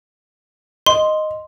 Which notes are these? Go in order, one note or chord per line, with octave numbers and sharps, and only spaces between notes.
D#5 C6